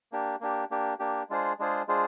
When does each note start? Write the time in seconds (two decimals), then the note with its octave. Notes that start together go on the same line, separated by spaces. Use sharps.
0.12 A#3 D4 G4
0.41 A#3 D4 G4
0.71 A#3 D4 G4
0.99 A#3 D4 G4
1.30 G#3 D4 F4 G#4 C5
1.59 G#3 D4 F4 G#4 C5
1.88 G#3 D4 F4 G#4 C5